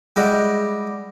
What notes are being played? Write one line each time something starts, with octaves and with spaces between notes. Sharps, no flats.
G3 G#3 E4 F#4 G4